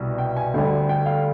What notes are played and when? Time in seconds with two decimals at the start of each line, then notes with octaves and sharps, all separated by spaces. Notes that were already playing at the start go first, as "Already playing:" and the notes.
Already playing: C2 B2 G3
0.18 G5
0.37 G#5
0.54 D2 D3 G3
0.89 G5
1.06 F5